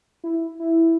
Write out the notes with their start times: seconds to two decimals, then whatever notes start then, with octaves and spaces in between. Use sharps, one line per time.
0.24 E4
0.60 E4